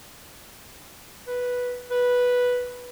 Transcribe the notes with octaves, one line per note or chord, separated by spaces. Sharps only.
B4
B4